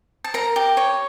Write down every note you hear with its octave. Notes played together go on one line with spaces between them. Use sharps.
A5
A#4 A#5
G4
C#5